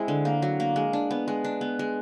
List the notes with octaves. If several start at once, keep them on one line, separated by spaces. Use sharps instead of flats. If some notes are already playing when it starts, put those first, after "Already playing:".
Already playing: G#3 C4 E4
D3
A#3
F#3
A#3
G#3
D4
B3
G#3
D4
B3
G#3